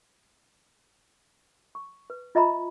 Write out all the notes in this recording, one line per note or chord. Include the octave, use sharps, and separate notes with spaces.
C#6
B4
F4 D#5 E5 A#5 B5